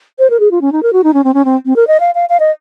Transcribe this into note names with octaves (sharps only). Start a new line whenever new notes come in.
C5
A#4
G#4
F4
C#4
D#4
A#4
F#4
D#4
C#4
C4
C#4
C4
C4
A#4
D#5
F5
F5
F5
D#5